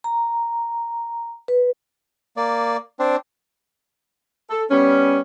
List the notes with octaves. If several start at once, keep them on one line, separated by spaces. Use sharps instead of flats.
A#5
B4
A#3 D5
C4 D4
A4
G3 B3 C#4